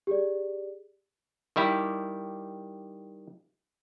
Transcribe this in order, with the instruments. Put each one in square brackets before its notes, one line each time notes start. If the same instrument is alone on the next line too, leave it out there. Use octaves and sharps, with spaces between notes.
[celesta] G4 G#4 D5
[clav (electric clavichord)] D#3 G3 E4 G4